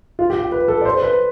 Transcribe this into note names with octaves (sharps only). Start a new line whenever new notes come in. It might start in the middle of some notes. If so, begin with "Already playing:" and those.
F4
G4
G4
B4
A4
D5
C5
B4